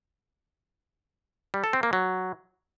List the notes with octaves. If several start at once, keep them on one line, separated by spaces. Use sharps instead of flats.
G3
A4
C4
A#3
F#3